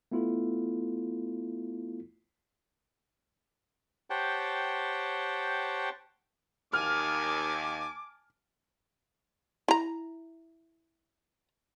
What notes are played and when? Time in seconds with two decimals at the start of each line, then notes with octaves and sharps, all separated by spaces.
0.11 A3 B3 E4 F4 A4
4.10 G4 C5 C#5 F#5 G5 A5
6.73 D#2 G#5 A5 D6 F6
9.68 E4 A#5